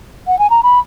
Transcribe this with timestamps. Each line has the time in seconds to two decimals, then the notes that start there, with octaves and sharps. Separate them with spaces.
0.27 F#5
0.39 G#5
0.50 A#5
0.63 B5